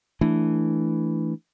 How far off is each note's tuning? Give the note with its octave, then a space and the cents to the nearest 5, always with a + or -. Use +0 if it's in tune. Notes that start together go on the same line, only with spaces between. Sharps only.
E3 +0 A3 +0 D4 +0